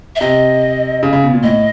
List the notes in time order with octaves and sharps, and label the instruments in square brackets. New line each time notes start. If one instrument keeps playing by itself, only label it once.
[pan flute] E5
[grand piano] C3 [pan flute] D#5
[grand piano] C#3
C#3
B2
A#2
[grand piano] A2 [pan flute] D#5